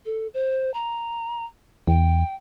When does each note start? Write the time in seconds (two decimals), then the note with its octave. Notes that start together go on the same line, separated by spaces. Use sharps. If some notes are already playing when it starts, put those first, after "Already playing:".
0.05 A4
0.34 C5
0.74 A#5
1.87 E2 G5